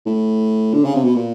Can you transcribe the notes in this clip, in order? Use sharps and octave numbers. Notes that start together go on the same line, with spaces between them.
A2
D3
C#3
C3
B2
A#2